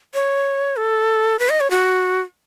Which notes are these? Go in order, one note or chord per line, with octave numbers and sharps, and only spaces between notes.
C#5
A4
B4
D#5
C#5
F#4